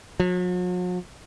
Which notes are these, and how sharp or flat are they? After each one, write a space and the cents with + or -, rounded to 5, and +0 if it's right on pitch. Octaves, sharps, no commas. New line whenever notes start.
F#3 -45